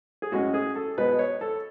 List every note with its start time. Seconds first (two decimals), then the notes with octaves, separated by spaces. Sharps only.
0.22 G#4
0.32 A2 G#3 C#4 F#4
0.54 G#4
0.76 A4
0.98 B2 G#3 B3 B4
1.19 C#5
1.41 A4